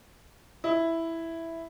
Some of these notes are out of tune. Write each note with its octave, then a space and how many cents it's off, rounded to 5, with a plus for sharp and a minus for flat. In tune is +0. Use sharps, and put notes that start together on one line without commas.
E4 +0